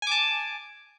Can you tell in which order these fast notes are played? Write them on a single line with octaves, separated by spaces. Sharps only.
G#5 D6 A5